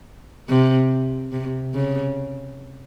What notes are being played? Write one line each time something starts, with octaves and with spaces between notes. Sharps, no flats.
C3
C3
C#3